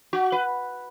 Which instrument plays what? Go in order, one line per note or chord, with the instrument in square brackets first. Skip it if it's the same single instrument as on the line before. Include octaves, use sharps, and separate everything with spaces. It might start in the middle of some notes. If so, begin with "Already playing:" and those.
[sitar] F#4
B4